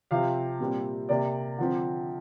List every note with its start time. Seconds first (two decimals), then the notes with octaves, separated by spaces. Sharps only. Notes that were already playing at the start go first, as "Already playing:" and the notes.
0.11 C3 F3 C4 F5
0.60 A#2 G3 C4
1.09 C3 A#3 D5
1.58 D3 F3 C4